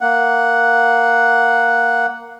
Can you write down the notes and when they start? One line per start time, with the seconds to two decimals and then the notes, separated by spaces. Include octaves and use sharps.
0.01 A#3 F#5